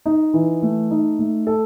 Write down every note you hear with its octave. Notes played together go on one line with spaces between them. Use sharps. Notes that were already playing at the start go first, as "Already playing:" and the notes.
D#4
E3
A3
D#4
A3
A4